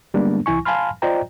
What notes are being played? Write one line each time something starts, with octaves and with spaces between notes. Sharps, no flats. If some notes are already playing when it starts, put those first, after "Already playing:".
D3 G3 G#3 A#3 B3 D4
C2 E3 E4 G#5 C#6
F5 G#5 A5 B5 C6 F6
F4 C5 D5 D#5 G5 A#5